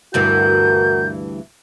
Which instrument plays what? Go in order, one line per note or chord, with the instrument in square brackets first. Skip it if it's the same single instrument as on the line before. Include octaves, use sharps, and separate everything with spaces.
[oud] D2 G2 E3 [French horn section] F#4 A#4 [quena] G6